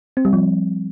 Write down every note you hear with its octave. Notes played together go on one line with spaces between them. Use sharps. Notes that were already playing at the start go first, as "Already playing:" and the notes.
C4
G3
F3